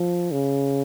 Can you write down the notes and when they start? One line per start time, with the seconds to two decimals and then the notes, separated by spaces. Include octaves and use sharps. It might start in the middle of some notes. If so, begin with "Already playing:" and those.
Already playing: F3
0.32 C#3